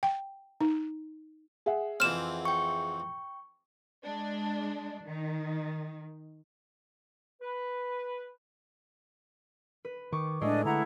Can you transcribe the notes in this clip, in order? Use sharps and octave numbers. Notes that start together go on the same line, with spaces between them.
G5
D#4
G#4 E5 F#5
F2 E3 C4 F6 E7
G5 C#6
G#3 D4
D#3
B4
B4
D#3 C#6 D6
A2 G#3 A3 D4 D5 D#5
D3 E4 F#5 A#5